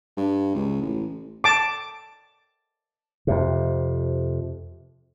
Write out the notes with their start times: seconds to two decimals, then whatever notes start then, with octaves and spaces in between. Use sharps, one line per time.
0.17 G2
0.55 C#2
0.81 A1
1.44 A5 D6
3.27 F2 C3